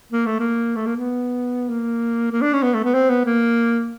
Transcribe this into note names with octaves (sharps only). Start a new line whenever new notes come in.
A#3
A3
A#3
A3
A#3
B3
A#3
A#3
D4
C#4
B3
A3
B3
C4
B3
A#3